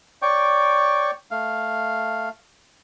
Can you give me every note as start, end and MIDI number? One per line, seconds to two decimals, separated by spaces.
0.22 1.11 73
0.22 1.11 74
0.22 1.11 79
0.22 1.11 85
1.31 2.29 57
1.31 2.29 77